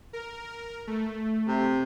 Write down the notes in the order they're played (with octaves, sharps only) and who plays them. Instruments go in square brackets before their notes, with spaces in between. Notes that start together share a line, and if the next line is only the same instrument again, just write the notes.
[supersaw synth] A#4
A3
[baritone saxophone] C3